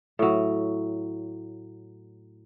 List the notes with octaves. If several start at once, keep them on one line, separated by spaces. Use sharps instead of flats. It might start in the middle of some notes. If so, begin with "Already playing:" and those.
A2 F#3